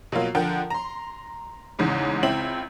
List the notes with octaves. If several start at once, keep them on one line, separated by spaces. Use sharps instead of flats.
B2 F#3 A#3 F4
D3 F3 A#4 F#5 G5
A#5 C6
A1 E2 G#2 C#3
C#2 C4 E4 F#7